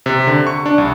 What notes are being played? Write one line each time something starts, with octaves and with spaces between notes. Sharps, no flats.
C3
D3
C#6
D4
C2